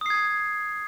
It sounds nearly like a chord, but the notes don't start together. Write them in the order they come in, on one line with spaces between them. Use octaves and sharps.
D#6 C7 G#6